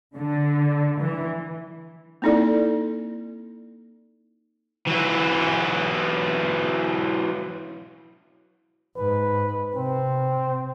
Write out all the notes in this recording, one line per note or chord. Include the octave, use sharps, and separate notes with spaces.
D3
E3
A#3 C4 D#4 E4 A4 D5
E3 F#3
G#2 B4
C3 C4